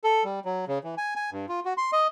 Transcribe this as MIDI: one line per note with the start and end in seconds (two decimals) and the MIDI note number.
0.04 0.23 69
0.24 0.40 55
0.45 0.65 54
0.68 0.79 49
0.84 0.95 52
0.98 1.14 80
1.16 1.30 80
1.32 1.46 43
1.49 1.60 65
1.65 1.73 66
1.77 1.91 84
1.93 2.07 75